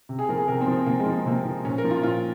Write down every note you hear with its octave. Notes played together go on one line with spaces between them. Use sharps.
C3
G#4
F3 A#4
G#4
C3 A#4
C4
F3
C4
C3 A#3
G#3
F3
A#3
C4
C3 A#3
F3
A#2 C#4
A#4
F3
F4
A#2 F4